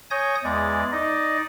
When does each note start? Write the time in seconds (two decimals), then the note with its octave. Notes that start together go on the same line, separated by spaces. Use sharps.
0.11 C#5 G#5 D#6 G6 A#6
0.44 E2 G#3 D5
0.92 D#4 D5 D#5